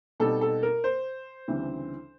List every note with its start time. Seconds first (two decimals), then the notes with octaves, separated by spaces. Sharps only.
0.20 B2 G3 C4 D#4 A4
0.41 A4
0.63 A#4
0.84 C5
1.48 D2 C#3 E3 G3 C4